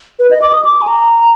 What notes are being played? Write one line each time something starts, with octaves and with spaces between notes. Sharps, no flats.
B4
D#5
D6
D#6
D6
G#5
A#5